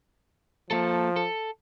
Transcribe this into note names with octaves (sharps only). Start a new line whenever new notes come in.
F3 A#3 A4
A4